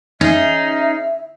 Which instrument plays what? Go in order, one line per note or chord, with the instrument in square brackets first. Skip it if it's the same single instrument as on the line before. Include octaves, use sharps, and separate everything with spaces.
[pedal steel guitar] C#4 G#4 [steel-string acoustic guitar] D#4 [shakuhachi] E5